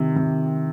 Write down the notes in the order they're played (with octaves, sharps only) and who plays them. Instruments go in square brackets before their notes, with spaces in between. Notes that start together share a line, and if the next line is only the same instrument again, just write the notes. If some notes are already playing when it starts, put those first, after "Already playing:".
Already playing: [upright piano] C3 [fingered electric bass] D#3
[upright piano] C3